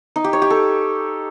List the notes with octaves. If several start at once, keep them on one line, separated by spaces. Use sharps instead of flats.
D#4
G4
C#5
G4
A4